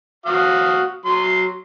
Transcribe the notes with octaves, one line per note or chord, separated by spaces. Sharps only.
F#4 F5 D#6
F#3 C6